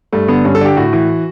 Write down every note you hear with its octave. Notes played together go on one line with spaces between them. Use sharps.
G2 A3
D3 B3
G2 C#4
A4
D3 G4
A2 F#4
E3